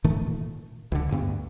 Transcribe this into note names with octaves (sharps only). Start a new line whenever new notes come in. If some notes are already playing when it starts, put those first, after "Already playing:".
G#2 D#3 E3 A3
A#2
C#2 D3
D2 G2 B3